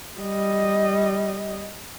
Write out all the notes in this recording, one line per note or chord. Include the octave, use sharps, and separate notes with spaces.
G3 D#5